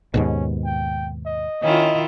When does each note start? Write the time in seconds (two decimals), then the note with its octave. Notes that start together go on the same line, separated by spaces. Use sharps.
0.14 D#2 G#2 B2 C#4
0.65 G5
1.26 D#5
1.63 D#3 C#4 E4 F4 D#5